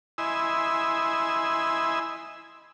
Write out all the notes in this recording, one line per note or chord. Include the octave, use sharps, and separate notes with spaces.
E4 D#5 G#5 B5 C6 E6